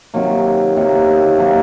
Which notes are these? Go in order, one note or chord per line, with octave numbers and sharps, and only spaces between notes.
C3 D#3 F#3 A#3
C3 D#3 F#3 A#3
C3 D#3 F#3 A#3